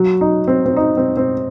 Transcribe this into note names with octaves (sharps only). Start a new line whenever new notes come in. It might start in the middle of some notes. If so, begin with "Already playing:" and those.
Already playing: F#3 F#4
D#4
C4
C4
D#4
C4
C4